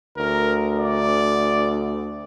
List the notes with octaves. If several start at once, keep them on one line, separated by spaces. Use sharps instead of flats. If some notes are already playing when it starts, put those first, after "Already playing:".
D2 A#4
D5